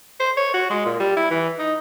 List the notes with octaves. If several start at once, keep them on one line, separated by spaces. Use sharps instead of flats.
C5
C#5
F#4
G#3
A#2
G3
E4
E3
D#4